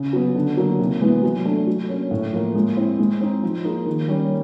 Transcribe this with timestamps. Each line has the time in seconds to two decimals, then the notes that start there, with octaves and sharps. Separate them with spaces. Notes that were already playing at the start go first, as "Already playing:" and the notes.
Already playing: C#3
0.13 F#3 B3
0.35 D3
0.57 F#3 A#3 D#4
0.79 C3
1.01 E3 G#3 B3
1.23 F#3
1.45 A3 D4
1.67 F#3
1.89 A#3 C#4
2.11 A2
2.33 F3 A#3
2.55 G#3
2.77 C4 E4
2.99 G#3
3.21 C4 D#4
3.43 F3
3.64 A#3 D#4 G#4
3.86 D#3
4.08 G3 A#3 C#4